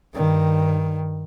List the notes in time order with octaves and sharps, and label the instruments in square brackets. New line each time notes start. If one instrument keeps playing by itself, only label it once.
[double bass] G2 D#3